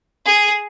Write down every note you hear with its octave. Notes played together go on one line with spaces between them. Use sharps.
G#4